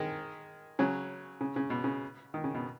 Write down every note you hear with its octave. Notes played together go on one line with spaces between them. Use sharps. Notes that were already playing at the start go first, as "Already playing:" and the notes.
Already playing: D#3 G#3
C#3 F#3
C#3
C#3
B2
C#3
D#3
C#3
B2